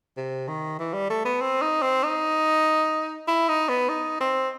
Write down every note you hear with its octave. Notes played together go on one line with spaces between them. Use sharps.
C3
D#3
E3
G3
A3
B3
C4
D#4
C4
D#4
E4
D#4
B3
D#4
C4